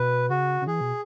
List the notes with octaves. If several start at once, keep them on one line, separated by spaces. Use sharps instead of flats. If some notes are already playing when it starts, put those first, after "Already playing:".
Already playing: B2 B4
C#3 F#4
C#3
E3 G#4
B2